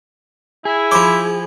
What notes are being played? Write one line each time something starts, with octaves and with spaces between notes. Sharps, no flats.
E4 G#4
F3 C5 B5 D6